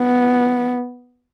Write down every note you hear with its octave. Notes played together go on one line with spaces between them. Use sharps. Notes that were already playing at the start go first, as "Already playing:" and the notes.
Already playing: B3